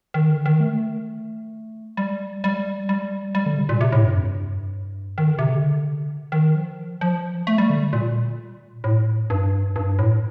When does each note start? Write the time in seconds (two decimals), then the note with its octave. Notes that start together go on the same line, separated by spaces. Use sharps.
0.14 D#3
0.29 D3
0.46 D#3
0.60 A3
1.97 G3
2.44 G3
2.89 G3
3.35 G3
3.46 D3
3.58 C3
3.69 A#2
3.81 C3
3.92 A2
4.04 G2
4.15 F2
4.27 G2
5.18 D#3
5.28 D3
5.39 C3
5.49 D3
6.32 D#3
6.55 F3
7.01 F3
7.47 A3
7.58 G3
7.70 D3
7.93 A#2
8.84 A2
9.30 G2
9.76 G2
9.99 A2